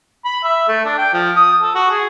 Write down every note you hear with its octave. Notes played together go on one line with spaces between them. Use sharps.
B5
E5
A3
D4
G5
F3
D#6
A4
F#4
G#4